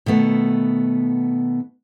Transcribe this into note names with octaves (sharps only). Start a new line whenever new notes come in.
B2 D#3 A3 B3